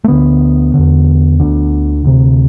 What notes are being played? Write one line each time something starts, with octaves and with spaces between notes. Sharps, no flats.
A3
D2 D3 B3
E2 D3
D2 D3
D2 C3